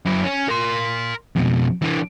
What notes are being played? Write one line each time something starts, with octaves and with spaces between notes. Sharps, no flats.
F#2 E4
C#4
A#4 C6
F2 B2
E3 D4